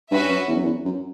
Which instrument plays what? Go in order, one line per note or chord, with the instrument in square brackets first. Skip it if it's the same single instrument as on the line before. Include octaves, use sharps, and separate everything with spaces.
[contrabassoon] G2 [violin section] C#4 F#4 B4 E5
[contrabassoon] F#2
E2
F#2
E2
F#2